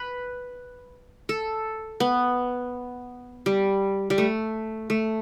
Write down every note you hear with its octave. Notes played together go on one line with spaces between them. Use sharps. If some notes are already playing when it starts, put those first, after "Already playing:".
Already playing: B4
A4
B3
G3
G3
A3
A3